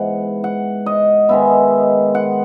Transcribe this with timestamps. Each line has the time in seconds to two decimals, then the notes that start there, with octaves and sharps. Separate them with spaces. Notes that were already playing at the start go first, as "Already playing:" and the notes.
Already playing: G#2 E3 B3 F#5
0.44 F#5
0.86 D#5
1.29 D#3 G#3 B3 E5
2.15 F#5